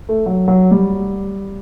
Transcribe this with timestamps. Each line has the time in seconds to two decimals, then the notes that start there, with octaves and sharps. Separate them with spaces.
0.09 A3
0.26 F#3
0.48 F#3
0.71 G3